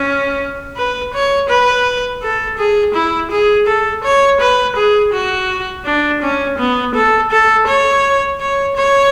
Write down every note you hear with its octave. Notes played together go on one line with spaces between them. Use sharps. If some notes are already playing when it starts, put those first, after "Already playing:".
Already playing: C#4
B4
C#5
B4
A4
G#4
E4
G#4
A4
C#5
B4
G#4
F#4
D4
C#4
B3
A4
A4
C#5
C#5
C#5